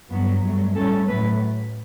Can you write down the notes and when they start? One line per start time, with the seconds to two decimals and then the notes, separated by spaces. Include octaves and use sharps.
0.10 G2 F#3 B3
0.43 G2 F#3 A3
0.75 A2 G3 C#4 A4
1.08 A2 F#3 A3 B4